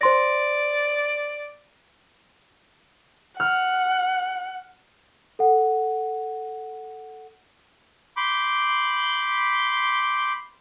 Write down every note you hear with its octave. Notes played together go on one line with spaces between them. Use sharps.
C5 D5 C6 A#6
F#5 F6
A4 F#5
B5 C6 D6 G6